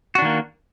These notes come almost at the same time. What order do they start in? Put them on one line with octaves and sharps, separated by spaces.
F#4 D4 D#3 A#3